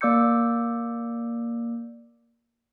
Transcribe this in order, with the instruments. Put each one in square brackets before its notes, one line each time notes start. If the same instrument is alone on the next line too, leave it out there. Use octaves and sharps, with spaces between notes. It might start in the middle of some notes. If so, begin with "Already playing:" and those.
[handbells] A#3 D5 D6 E6 G6 C#7